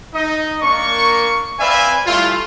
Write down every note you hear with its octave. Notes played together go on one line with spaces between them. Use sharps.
D#4 D#5
A#3 D4 A#4 C#6
C4 B4 D5 E5 F5 G#5
G3 A3 E4 F4